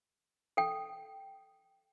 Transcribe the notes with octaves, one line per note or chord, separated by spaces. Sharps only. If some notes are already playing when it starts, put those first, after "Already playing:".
A4 G5